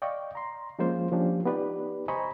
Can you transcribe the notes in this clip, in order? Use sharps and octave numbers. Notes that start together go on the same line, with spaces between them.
D5 D#5 F5 G5 C#6
A#5 C6
F3 G#3 A#3 C#4 F4 C5
F3 A#3 C#4 D4 G4
B3 D#4 G4 B4 D5
C5 D#5 G#5 A#5 B5 C#6